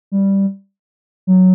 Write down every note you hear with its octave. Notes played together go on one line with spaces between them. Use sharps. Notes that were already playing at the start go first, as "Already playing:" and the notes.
G3
F#3